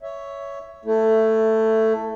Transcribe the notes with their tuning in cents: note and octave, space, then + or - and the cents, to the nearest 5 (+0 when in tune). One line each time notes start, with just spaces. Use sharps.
C#5 +10 E5 +0
A3 +10 E4 +0